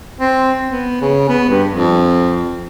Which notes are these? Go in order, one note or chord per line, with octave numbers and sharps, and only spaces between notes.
C4
B3
C#3
B3
G2
F2